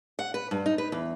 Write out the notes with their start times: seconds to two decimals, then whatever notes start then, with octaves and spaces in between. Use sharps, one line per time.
0.19 F#5
0.34 B4
0.51 G2
0.66 D#4
0.78 B4
0.92 E2